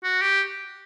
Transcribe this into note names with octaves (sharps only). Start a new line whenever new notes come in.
F#4
G4